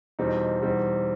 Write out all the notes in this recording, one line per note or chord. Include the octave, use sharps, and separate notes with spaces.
E2 B2 G3 C4 D#4
E2 B2 G3 C4 D#4